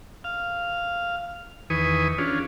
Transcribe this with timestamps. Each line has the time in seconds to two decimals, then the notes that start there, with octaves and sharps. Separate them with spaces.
0.24 F5
1.70 E2 D#3 B4 G#5 C#6 D#6
2.18 C#4 D4 F4 G#4